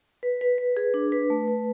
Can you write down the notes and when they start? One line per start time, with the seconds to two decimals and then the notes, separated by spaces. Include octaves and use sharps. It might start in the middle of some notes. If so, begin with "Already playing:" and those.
0.23 B4
0.41 B4
0.58 B4
0.77 G#4
0.94 D4
1.12 B4
1.30 A3
1.48 B4